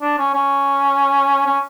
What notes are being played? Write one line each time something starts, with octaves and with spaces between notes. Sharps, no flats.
D4
C#4
C#4
C#4